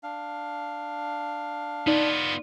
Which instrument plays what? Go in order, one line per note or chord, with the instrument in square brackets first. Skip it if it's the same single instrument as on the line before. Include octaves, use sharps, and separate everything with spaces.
[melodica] D4 F5
[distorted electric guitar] B3 F4 [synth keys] D#4 D5